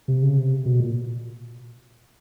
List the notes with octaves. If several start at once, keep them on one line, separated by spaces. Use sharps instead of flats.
C3
C#3
C3
B2
A#2